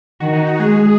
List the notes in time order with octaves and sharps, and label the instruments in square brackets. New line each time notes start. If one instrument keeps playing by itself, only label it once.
[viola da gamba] D#3 [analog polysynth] F#4
[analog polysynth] D#4
F#4
[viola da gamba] G#3 [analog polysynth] G#4